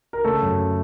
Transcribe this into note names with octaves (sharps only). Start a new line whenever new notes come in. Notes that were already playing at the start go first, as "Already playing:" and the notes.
A#4
C#3 A3 A4
F#2
C#3